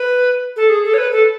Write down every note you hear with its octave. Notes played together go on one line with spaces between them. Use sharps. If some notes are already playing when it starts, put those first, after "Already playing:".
Already playing: B4
A4
G#4
A4
C#5
B4
A4